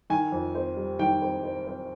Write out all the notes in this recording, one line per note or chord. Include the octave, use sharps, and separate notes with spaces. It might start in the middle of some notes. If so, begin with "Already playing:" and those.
D#3 G#5
F2
C4
G3
D#3 G5
C4
C4
C4